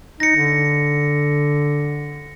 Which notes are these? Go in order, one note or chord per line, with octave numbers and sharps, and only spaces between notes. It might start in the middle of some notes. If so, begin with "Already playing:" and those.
D#4 A#6 C#7
D3